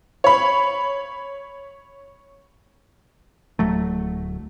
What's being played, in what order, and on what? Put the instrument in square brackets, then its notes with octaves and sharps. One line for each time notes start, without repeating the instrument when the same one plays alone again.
[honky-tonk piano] C#5 B5
[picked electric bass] D1 F#3 A3